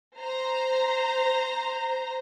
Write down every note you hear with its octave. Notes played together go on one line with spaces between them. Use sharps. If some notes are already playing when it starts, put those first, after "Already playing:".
C5 A#5